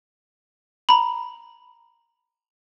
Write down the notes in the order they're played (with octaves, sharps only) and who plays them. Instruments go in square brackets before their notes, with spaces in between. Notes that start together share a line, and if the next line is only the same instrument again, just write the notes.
[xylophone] A#5 B5